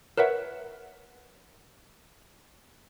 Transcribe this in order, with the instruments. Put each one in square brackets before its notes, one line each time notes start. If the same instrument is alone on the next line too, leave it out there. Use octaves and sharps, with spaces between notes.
[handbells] A#4 B4 C#5 E5 F#5